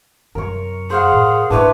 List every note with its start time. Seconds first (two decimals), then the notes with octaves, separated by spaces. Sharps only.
0.35 F#2 C3 A#4 C#5
0.90 G#4 C5 F5 F#5
1.12 A2
1.50 G#2 A3 D4 E4 B4 C#5